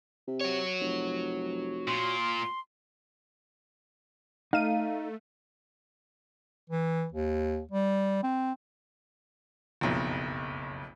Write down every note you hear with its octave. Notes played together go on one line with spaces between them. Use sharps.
C3
F#4 C#5
F1
A#2 C6
A3 D#4 F5 D#7
E3
D#2
G3
C4
F#1 B1 F2